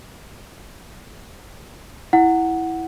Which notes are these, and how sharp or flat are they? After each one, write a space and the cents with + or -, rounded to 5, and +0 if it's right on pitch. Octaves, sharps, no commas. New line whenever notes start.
E4 -5 F#5 +0